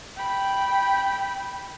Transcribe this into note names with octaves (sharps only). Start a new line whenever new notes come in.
G5 B5